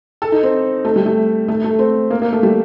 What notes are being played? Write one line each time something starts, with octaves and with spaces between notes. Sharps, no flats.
A4
D#4
C4
A3
G3
A3
A3
A3
C4
A#3
A#3
A3
G3